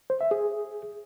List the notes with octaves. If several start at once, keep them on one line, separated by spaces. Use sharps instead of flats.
C5
E5
G#4